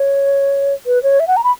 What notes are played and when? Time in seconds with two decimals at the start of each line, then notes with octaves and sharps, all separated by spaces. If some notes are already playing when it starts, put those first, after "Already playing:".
Already playing: C#5
0.87 B4
1.03 C#5
1.20 E5
1.28 F#5
1.37 A#5
1.44 B5